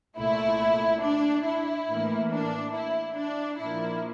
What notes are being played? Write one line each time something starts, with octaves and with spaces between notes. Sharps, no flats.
C2 A#2 A3 E4
D4
E4
A2 E3 A#3
D4
E4
D4
A#2 F3 A#3 E4